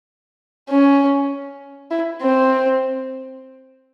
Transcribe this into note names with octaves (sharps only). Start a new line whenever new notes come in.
C#4
E4
C4